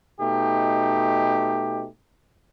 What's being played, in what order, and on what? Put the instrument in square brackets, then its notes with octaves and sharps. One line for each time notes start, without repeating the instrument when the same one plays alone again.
[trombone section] B2 A3 D#4 G4